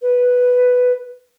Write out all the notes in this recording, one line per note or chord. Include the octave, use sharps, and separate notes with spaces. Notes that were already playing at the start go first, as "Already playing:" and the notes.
B4